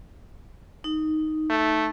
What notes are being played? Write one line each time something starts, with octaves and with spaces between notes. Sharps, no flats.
D#4
A3